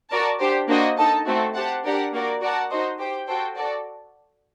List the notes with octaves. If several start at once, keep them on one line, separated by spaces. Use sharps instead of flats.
F#4 A#4 D5 A5
D4 G4 C5
A#3 D4 F#4 C5 D#5
D#4 A4 D#5 A5
A3 C4 F#4 A4
G4 C5 F#5 A5
D4 G4 A#4 D5 F#5
A#3 F#4 A#4 D5
F#4 A#4 D5 F#5 A5
D#4 F#4 C5 D#5
G4 C5 G5
F#4 A4 C5 G5
F#4 A4 D5